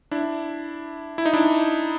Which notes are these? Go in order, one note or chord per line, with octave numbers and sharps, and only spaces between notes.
D4 E4
E4
D#4
D4 E4